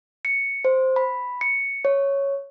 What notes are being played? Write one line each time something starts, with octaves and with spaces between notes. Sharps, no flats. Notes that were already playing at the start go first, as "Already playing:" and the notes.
C#7
C5
B5
C#7
C#5